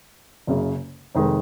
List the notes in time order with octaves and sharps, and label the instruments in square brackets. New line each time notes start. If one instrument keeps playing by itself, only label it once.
[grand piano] F#1 F#2 C#3
F1 F2 D#3 G#3